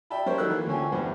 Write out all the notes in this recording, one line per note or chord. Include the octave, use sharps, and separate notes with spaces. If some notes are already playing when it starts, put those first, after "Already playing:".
D5 E5 G5 A5 B5
G3 C#4 A#4 C5 D5
D#3 F#3 A#3 A4 E6 F#6
E3 A#3
D2 D3 F3 C#4 G5 G#5
E2 G2 C5 F#5